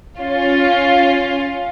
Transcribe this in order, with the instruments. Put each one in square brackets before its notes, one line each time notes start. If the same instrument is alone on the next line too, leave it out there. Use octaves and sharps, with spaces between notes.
[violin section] C#4 F4